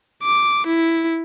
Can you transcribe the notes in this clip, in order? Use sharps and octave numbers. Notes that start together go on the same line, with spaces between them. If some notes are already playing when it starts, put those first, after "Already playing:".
D6
E4